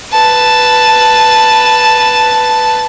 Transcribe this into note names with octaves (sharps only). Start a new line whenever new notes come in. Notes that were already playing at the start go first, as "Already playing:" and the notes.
B4 A5